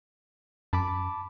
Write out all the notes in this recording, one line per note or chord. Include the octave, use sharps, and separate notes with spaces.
F#2 A5 B5 D6